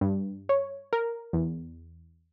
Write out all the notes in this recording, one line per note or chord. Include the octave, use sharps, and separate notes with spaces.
G2
C#5
A#4
E2